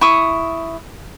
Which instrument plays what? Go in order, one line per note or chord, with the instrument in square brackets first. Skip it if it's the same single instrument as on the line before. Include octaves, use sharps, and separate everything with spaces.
[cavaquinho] E4 C#6 D#6